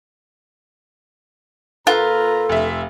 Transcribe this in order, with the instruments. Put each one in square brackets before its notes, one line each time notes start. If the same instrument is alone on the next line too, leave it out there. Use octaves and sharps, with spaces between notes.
[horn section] A#2 B4 A#5 [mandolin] F4 [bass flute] A4
[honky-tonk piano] F1 E5